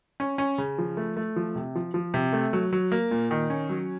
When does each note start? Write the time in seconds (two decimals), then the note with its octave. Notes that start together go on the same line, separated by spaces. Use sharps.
0.20 C#4
0.38 C#4
0.58 C#3
0.78 F3
0.97 A3
1.17 A3
1.36 F3
1.55 C3
1.75 F3
1.94 F3
2.14 C3
2.33 A3
2.53 F#3
2.73 F#3
2.92 A#3
3.11 A#2
3.31 D#3
3.50 C#4
3.69 F#3